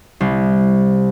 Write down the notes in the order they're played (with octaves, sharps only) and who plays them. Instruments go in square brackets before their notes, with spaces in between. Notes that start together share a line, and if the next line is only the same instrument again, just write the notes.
[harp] C2